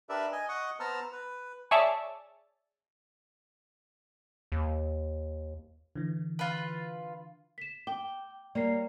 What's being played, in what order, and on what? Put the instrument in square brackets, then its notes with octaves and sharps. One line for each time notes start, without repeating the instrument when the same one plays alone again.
[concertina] D4 G4 A#4 B4 D5 E5
D#5 G#5
D#5 F#5 C#6 D#6
B3 C5 A5 A#5 E6 F6
B4
[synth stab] G#4 C#5 D5 E5 A5
[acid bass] D#2
[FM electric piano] D3 E3
[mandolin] F4 B4
[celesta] B6 E7
[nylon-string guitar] G5 [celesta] D6 G7
[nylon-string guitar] G3 A#3 C#5 [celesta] D5 C7